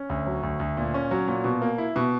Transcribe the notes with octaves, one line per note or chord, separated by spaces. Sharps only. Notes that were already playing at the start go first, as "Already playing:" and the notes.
Already playing: C#4
D2
F#3
D2
D2
A#2
C#4
F#3
A#2
B2
A#3
E4
B2